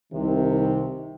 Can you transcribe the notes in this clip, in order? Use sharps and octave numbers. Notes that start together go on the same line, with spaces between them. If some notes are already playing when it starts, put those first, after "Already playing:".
C2 C3 D#3